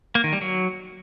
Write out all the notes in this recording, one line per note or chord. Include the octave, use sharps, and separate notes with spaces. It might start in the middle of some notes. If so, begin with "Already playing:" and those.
A#3
D#3
G3
F#3